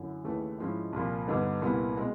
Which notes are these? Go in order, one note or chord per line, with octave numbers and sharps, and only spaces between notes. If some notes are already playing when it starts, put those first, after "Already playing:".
Already playing: F#2 D3 E4
D#2 C#3 E3 A3
G#2 F3 G#3 C#4 E4
C2 A#2 F3
G2 D3 G3 B3 D#4
C2 A#2 G3 B3 E4
B2 G#3 C4